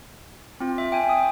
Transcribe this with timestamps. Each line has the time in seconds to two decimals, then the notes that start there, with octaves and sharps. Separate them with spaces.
0.60 C4 F4
0.78 E5
0.92 G5 G#5
1.09 D#6